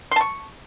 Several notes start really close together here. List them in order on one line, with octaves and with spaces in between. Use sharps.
C6 A5 C#6